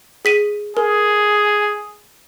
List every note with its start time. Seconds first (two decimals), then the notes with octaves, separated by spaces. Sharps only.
0.25 G#4 B6 D#7
0.77 G#4 A#4